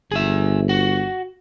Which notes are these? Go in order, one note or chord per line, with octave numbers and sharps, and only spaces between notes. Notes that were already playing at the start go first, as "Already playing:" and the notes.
G1 G#4 E5
F#4